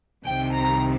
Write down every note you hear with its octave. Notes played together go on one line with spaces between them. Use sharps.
C2 C3 D#3 G5
A#5